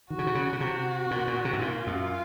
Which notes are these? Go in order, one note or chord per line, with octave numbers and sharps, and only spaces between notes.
D#3 F#4
C#3
C3
C#3
C#3
C3 F#4
A#2
A#2
C3
G#2
A#2 F4
F#2